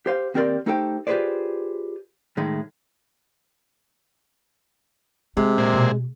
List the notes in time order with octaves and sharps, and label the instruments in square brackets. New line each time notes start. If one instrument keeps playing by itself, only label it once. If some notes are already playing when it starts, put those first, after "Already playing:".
[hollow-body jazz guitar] G4 C5 F5
D#2 C4 G4 A#4 D5 C6
A3 D#4 G4 A4 C5 G5
F4 G4 G#4 B4 C5 D5
A2 D#3 G#3 A3
[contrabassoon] C3 [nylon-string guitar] G#3 [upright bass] D#4
[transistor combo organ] A#2 C4 G#4
[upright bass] B2